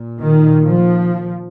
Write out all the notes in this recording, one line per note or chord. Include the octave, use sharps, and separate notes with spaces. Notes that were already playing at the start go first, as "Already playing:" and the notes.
Already playing: A#2
D#3
F3